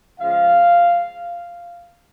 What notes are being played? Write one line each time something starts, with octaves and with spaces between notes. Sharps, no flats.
C#3 F3 G#3 F5